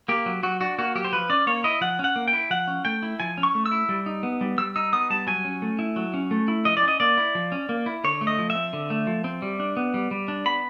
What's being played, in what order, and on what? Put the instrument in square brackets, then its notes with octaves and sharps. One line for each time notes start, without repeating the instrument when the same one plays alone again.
[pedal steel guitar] A#3 G4
F#3
F#3 F#4
D4 F#4
A#3 F#4
F#3 G4
C5
F3 B4
C#4 D5
A#3 C#5
E4 D#5
F3 F#5
C#4
F#5
A#3
G5
E4
F3 F#5
C#4
A3 G5
E4
F3 G#5
C#4
C#6
A3
E6
E4
G3
D#4
B3
G3
G3 E6
D#4 E6
B3 D#6
G3 A5
F#3 G#5
C#4
A3
E4
F#3
C#4
A3
E4
F3 D#5
D5
C#4 D#5
A#3 D5
E4
F3
C#4
A#3
E4
D3 C#5
A3
D#5
F3
E5
C4
D3
A3
F3
C4
G3
D4
B3
G3
G3
D4
B3 B5